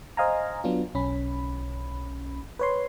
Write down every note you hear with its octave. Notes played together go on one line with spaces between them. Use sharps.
C5 D#5 F5 G#5 A#5
F#3 B3 D4 F4
B1 C#4 B5
B4 C#5 C6